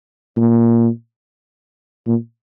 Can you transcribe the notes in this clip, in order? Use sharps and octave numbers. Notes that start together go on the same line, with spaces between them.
A#2
A#2